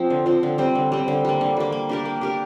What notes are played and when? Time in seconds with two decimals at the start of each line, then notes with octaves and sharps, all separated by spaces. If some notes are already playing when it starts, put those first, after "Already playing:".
Already playing: F3 C4
0.10 D3
0.26 F3 C4
0.43 D3
0.58 G3 C4
0.75 D3
0.92 G3 C4
1.08 D3
1.25 G3 A#3
1.41 D3
1.57 G3 A#3
1.72 A#3
1.89 D4 G4 A#4
2.05 A#3
2.21 D4 G4 A#4